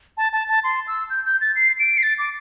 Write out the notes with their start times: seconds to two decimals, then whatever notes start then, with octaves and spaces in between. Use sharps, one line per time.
0.17 A5
0.33 A5
0.49 A5
0.64 C6
0.88 E6
1.10 G6
1.25 G6
1.41 A6
1.56 C7
1.79 D7
1.98 C7
2.03 A6
2.18 D6